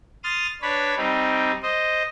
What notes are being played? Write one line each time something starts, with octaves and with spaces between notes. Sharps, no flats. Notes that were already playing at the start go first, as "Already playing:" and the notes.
C6 D#6 F6 A6
D4 B4 C#5 B5
G3 C4 D#4
C5 D#5